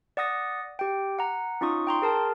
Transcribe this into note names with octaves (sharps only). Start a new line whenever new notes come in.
D5 F#5 D#6 A#6
G4 G5
F#5 A#5
C#4 D#4 F4 C#6 D#6
G5 A#5 C6
G#4 A#4 A5